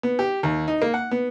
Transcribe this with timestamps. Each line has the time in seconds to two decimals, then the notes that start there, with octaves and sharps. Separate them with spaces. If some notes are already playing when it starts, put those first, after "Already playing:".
0.03 B3
0.19 G4
0.43 D#2
0.68 D#4
0.82 A#3
0.94 F#5
1.11 B3